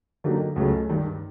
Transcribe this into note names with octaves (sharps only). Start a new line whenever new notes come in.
D3 F#3 A#3 D#4 G4
C#2 C#3 F#3 A3
G2 D#3 G3